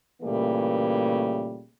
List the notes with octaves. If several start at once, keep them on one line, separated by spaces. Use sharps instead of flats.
A#2 C#3 E3 G3 A3 A#3